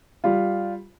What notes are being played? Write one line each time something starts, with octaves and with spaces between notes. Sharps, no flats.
G3 F4